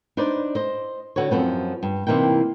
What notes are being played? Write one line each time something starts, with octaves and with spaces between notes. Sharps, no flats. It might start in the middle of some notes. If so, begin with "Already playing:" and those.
D4 D#4 B4 C5 D5
C5 D#5
D3 F#4 B4 C#5
F#2 F3 B3 C4
G2
C3 E3 A#3 D#4 G5